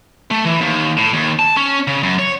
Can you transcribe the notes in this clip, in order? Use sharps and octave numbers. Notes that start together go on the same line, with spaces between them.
A3
E3
D#2
A2
D#2
A5
C#4
C#3
F#2
C#5